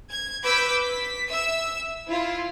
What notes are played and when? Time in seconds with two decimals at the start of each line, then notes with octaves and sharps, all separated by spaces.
0.11 G#6
0.43 B4 D6 E6 G6 B6
0.81 B6
1.29 E5 E6
2.08 E4 F4